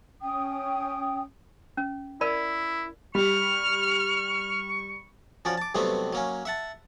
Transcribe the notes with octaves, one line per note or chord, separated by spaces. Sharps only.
C#4 G5 D#6
C#4
E4 A#4 D5 B5
G3 C#6 F6
F3 C#4 F#4 D5
A5 D6
G2 C3 F#3 A3 B3 C4
F#3 A#3 C#4
E5 F#5 A5